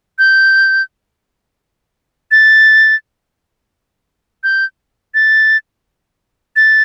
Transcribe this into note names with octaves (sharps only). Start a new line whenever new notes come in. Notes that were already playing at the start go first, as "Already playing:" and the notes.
G6
A6
G6
A6
A6